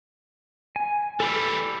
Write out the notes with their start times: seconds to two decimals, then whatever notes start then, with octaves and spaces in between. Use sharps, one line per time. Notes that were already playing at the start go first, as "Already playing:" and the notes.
0.76 G#5
1.20 E3 G3 A4 B5 E6